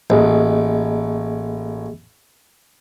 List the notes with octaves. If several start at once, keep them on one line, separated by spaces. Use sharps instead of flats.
A1 A#3 G#4 D#5